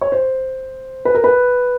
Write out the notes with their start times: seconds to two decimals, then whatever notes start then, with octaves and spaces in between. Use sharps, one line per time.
0.01 C#5
0.12 C5
1.05 B4
1.15 A#4
1.24 B4